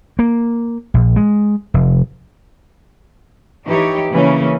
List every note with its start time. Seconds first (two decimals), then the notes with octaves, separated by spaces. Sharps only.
0.19 A#3
0.94 A#1
1.16 G#3
1.74 F1
3.67 E3 D#4 G4 C#5
4.11 C#3 E3 A#3 C#4